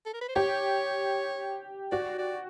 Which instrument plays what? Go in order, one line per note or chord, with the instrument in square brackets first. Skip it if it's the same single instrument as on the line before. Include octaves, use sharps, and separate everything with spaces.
[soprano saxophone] A4
A#4
B4
C5
[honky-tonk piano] G4 [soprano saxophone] C#5
[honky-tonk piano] F#4 [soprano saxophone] D5
[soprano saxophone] D5